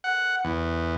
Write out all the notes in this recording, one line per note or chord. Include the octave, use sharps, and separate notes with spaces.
F#5
E2